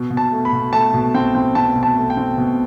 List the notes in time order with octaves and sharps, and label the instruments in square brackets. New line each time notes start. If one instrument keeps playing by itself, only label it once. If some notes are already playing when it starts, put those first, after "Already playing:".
Already playing: [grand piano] B2
B2
A5
A3
B5
B2
A3 A5
B2
C4 G5
C4
C4 A5
B2
A5
A3
G5
C4
B2